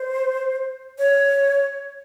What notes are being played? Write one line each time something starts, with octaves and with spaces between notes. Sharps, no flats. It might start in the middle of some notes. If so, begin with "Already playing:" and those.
Already playing: C5
C#5